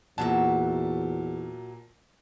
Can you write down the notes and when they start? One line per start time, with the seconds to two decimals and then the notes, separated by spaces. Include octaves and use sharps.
0.18 E2 A#2 F#3 F#4 E5 A5